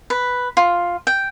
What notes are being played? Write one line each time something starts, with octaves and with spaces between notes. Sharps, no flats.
B4
F4
G5